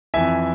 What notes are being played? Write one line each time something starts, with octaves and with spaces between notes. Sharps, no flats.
F2 E3 E5 G#5